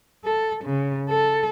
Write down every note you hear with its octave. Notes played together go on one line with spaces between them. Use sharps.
A4
C#3
A4